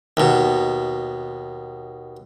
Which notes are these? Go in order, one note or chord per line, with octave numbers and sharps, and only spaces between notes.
D#2 B2